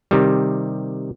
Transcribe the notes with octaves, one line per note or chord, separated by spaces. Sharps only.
C3 D#3 G3